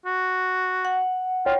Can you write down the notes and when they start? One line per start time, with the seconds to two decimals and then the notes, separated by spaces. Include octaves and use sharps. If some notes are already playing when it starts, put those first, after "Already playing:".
0.06 F#4
0.85 F#5
1.46 F4 C#5 G5